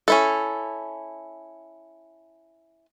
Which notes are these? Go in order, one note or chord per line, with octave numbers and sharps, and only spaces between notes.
C#4 E4 A4